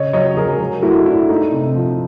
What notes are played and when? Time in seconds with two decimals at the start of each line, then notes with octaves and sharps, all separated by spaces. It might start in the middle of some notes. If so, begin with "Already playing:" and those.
Already playing: C#3 C#5 D#5
0.13 F#3 C#5 D#5
0.37 F#3 G#4 A#4
0.60 F#3
0.82 A3 E4 F#4
1.06 D4 E4
1.29 A3 D#4
1.52 C3
1.75 F3